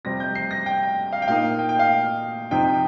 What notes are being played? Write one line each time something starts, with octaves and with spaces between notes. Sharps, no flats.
F2 C3 G3 C4 A#6
G6
C7
A#6
G5
F5
G5
A#2 A#3 D#4 F5
G5
G5
F5
F2 C3 F3 D#4 G5